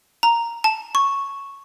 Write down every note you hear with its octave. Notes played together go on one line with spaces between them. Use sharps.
A#5
A5
C#6